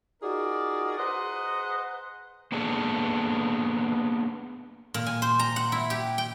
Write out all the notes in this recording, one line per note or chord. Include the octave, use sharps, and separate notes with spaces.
D#4 F4 F#4 G#4 A#4 D5
G#4 B4 C5 D#5 F#5 A#5
A#3 B3 D4 G#4 A4
A#2
G#5
C5
A#5
F#5
E4
G4
G5